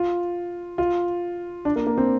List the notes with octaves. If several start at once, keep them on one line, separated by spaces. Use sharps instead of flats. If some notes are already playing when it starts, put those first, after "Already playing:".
Already playing: F4
F4
D4
A#3
A#3
C4